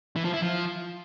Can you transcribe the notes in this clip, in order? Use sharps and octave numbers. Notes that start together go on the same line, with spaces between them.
E3
F3
E4
F3